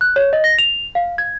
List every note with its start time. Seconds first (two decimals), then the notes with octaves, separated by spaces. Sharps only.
0.01 F#6
0.16 C#5
0.33 D#5
0.44 A#6
0.59 F7
0.95 F5
1.18 G#6